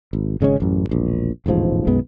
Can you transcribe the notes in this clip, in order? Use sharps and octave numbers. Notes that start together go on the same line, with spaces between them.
G#1
G#1 C#3 G#3 C#4
A1 F#2
E1 A#1
E1 A1 G#2 F3
B1 F#2 G#3 B3